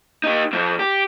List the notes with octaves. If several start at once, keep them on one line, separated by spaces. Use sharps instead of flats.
D#4 G4
F2 C4
G4